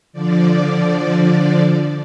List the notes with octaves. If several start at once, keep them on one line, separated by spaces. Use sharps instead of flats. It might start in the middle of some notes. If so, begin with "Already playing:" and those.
D3 F3 D5